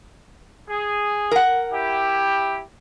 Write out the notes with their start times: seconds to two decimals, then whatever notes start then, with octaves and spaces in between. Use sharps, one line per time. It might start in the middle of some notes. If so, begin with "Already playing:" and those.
0.69 G#4
1.31 A#4 F#5
1.72 E4 G4